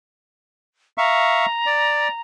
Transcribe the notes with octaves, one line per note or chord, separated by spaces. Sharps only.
E5 F5 A#5 C#6
D5